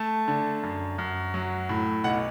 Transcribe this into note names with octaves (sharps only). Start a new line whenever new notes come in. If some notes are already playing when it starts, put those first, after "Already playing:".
Already playing: A3 A5
D3
F#2
F#2
F#3
A2
B1 F#5